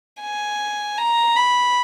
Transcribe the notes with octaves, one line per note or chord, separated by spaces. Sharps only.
G#5
A#5
B5